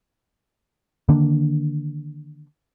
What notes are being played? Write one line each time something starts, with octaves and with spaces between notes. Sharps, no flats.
D3 D#3 A#3 D4